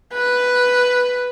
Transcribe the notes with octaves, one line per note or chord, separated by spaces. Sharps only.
B4